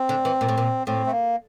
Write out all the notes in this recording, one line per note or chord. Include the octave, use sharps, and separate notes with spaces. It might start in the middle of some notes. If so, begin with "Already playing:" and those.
Already playing: C4
D3
E3
A#2
A2
A#2
A2 C4
A3
A#3